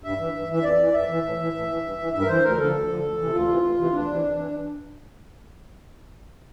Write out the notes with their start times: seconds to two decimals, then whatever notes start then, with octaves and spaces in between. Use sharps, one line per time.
0.04 G2 E5
0.19 E3
0.34 G2
0.49 E3 E5
0.63 F2 D5
0.79 E3
0.94 F2 E5
1.09 E3
1.23 A2
1.39 E3
1.54 A2
1.68 E3
1.83 G2
1.99 E3
2.13 G2 E5
2.21 A#4
2.28 E3 C5
2.43 D2 A#4
2.58 D3 F3 A4
2.73 D2
2.88 D3 F3
3.03 D2
3.18 C3 E3
3.33 D2 F4
3.48 C3 E3
3.63 D2
3.77 C3 E3
3.92 D2 D4
4.07 C3 E3
4.22 F2
4.37 E3